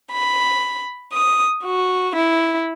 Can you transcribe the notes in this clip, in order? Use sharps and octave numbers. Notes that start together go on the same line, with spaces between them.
B5
D#6
F#4
E4